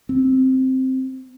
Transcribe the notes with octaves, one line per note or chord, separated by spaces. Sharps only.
C4